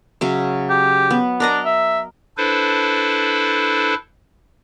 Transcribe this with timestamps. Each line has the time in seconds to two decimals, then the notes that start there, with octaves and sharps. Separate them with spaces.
0.21 C#3 F#3 E5
0.70 G4
1.11 B3
1.40 D4 A#4 D#5 A#5
1.65 E5
2.37 D4 E4 A4 B4 C5